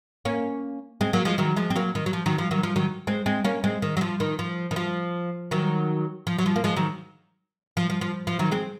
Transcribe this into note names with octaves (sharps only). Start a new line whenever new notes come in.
A#3 C#4
G#3 C4
F#3 A#3
F3 G#3
D#3 F#3
F3 G#3
C4
F#3 A#3
D#3
F#3
F3
D#3 F#3
F3
D#3 F#3
F3
D#3 F#3
G#3 C4
G#3 C4
A#3 C#4
G#3 C4
D#3
F#3
F3
D#3
F3
D#3
F3
D#3 F#3
F3
F#3
F3
A#3
F3 G#3
D#3 F#3
F3
F3
F3
F3
D#3 F#3
G#3 C4